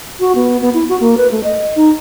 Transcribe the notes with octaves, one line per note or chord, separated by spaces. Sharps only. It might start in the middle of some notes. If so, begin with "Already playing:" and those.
F#4
B3
B3
E4
F#4
A#3
B4
A3
D#5
D#4